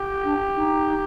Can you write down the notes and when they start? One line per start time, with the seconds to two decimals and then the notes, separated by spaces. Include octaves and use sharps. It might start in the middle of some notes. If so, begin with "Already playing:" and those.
Already playing: G4
0.24 D4
0.56 D#4